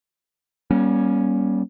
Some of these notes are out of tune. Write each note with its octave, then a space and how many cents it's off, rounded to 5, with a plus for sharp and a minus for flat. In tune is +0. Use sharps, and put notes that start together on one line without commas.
G3 -15 A#3 +40 C#4 +0